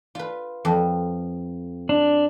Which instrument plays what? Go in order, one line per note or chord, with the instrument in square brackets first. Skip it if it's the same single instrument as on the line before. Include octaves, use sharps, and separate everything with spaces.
[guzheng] F4 B4
F2
[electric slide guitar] D4